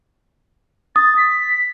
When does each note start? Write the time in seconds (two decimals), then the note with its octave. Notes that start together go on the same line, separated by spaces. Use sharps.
0.96 D#6 A6
1.17 B6